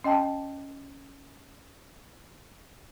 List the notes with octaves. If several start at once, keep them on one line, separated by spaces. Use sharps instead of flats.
C#4 D#5 G5 A5